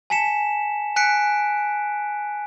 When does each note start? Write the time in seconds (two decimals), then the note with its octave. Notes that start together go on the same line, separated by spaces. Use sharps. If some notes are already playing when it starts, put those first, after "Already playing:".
0.10 G#5 A5 B6 C#7 E7
0.96 G#5 F#6 B6 C#7 D7